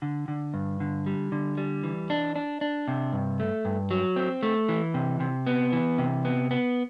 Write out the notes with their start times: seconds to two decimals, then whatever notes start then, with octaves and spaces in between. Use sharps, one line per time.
0.02 D3
0.28 D3
0.54 G2
0.80 D3
1.06 G3
1.32 D3
1.58 G3
1.83 E3
2.10 D4
2.36 D4
2.61 D4
2.88 C3
3.13 G2
3.40 A3
3.65 G2
3.91 F#3
4.16 C4
4.43 A3
4.69 E3
4.94 C3
5.20 C3
5.47 B3
5.73 E3
5.98 C3
6.25 B3
6.51 B3